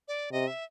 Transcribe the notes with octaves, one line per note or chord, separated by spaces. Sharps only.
D5
C3 D#5
E5